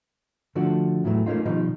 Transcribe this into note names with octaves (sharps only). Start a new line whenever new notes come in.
D3 F3 A3 D4 F#4
E2 A2 E3 F#3 A3
A3 A#3 C#4 D#4 F4
B2 D#3 F3 G3 D#4